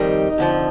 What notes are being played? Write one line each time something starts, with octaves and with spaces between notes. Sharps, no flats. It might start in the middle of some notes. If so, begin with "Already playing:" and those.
Already playing: F2 D#3 G3 D#4
F2 D3 F3